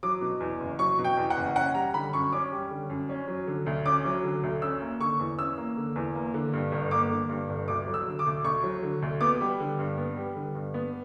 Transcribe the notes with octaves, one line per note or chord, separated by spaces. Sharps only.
F#3 D6
B2
E2
F#1
F#3 C#6
B2
G5
E2
F#5
F#1
C#4 F#5
G3 A#5
D3 B5
F#2 C#6
C#4 D6
G3
D3
F#2
C#4
F#3
D3
D2
C#4 D6
F#3
D3
D2
C#4 E6
A#3
D3 C#6
E2
C#4 E6
A#3
D3
E2
A#3
D3
G2
G1
A#3 D6
D3
G2
G1
D2 D6
F#3
E6
D3
D6
D2
D2 C#6
F#3
D3
D2
B3 D6
G3
D3
G2
B3
G3
D3
G2
B3